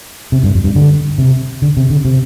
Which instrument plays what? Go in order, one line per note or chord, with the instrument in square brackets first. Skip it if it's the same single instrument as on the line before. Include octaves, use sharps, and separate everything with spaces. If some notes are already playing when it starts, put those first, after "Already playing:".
[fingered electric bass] C3
G2
F2
G2
D3
C3
D3
C3
D3
C3